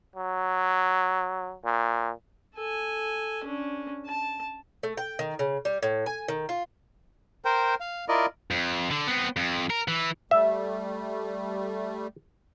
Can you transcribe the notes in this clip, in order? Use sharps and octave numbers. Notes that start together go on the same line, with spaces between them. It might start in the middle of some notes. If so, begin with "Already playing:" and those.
F#3
A#2
A4 G#5
C#4 D4
A5
A3
G5
D#3
C#3
G3
A2
G#5
D#3
F4
A#4 C5 G5
F5
E4 F4 A#4 D5 D#5
F2
D3
B3 C4
F2
A#4
E3
G3 A3 E5